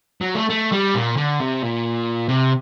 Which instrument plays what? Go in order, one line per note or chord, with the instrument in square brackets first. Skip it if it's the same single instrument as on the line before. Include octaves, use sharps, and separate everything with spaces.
[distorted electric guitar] F#3
A3
A3
G3
A#2
D3
C3
A#2
C3